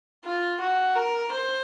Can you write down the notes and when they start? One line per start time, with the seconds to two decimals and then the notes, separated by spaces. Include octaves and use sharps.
0.25 F4
0.60 F#4
0.96 A#4
1.32 C5